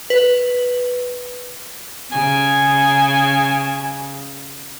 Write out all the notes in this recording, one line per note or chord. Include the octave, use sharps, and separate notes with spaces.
B4
C#3 G#5